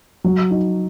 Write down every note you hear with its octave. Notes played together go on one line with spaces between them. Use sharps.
F#3
D#4